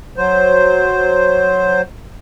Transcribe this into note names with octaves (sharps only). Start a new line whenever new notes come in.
F#3 C5